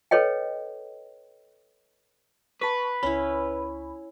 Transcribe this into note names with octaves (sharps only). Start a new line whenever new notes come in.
A4 B4 C#5 D#5 G5
B4 A5 C#6
C#2 C#4 E4 B5